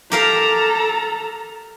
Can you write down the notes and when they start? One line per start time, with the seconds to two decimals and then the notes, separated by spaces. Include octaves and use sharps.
0.12 G4 A4 A#4 F5 A#5